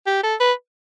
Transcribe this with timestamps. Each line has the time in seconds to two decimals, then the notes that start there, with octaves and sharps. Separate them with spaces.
0.06 G4
0.23 A4
0.40 B4